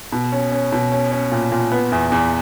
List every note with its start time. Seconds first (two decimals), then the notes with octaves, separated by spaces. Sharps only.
0.12 B2
0.32 C#4
0.52 C#4
0.72 B2
0.92 C#4
1.12 C#4
1.32 A#2
1.52 A#2
1.72 B3
1.92 E2
2.12 E2